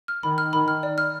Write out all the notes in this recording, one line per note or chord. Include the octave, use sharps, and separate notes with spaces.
F6
D#3 B5
F6
D#3 B5
F6
D5
F6